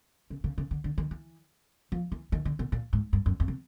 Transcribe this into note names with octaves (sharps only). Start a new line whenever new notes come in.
C#3
C#3
C#3
D3
D3
D#3
E3
F3
E3
D#3
D3
B2
A#2
G#2
G2
F#2
F2
C3